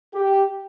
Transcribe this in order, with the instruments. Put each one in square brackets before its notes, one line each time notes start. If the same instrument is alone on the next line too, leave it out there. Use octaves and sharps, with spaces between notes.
[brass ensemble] G4